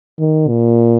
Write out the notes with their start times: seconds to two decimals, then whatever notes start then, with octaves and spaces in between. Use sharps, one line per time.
0.19 D#3
0.48 A#2